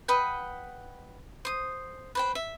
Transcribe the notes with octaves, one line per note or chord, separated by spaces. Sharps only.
B4 D#5 F#5 G5
C5 D#6
B4 C5 G5
E5